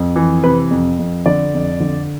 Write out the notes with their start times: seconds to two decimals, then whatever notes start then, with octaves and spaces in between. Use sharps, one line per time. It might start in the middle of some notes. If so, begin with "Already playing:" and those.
Already playing: F2
0.16 E3
0.43 C3 B4
0.71 F2
0.99 F2
1.26 D3 D5
1.54 F2
1.80 D3